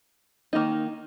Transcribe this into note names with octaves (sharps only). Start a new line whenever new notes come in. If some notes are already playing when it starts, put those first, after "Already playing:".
D#3 A#3 D#4